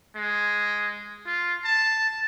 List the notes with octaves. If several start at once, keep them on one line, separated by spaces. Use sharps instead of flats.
G#3
F4
A5